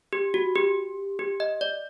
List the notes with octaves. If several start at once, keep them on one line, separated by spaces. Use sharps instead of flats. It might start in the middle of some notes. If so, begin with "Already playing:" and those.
G4
F#4
G4
G4
D#5
D5